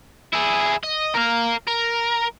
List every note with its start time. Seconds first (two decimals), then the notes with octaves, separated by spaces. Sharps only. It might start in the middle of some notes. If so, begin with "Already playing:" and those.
0.33 E4 G#4
0.83 D#5
1.15 A#4 F5
1.68 A#4